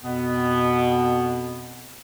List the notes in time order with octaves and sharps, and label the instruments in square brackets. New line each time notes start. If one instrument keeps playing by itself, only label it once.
[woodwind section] F2 B2 B3